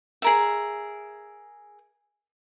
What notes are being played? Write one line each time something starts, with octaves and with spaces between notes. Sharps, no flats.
G#4 A#4 E5